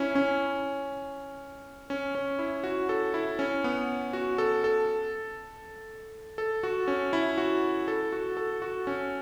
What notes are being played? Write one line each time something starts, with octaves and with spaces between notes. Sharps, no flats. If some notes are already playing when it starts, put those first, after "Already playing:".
Already playing: C#4 E4
C#4
C#4
C#4
E4
F#4
A4
E4
C#4
B3
F#4
A4
A4
A4
F#4
C#4
E4
F#4
A4
F#4
A4
F#4
C#4